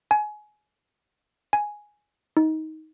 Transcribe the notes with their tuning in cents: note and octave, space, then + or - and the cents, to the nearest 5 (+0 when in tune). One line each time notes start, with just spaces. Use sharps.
G#5 +25
G#5 +5
D#4 +20